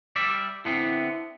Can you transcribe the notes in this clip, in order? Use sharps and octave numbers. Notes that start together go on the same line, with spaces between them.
G3 D5 E5
D3 B3 C4 E4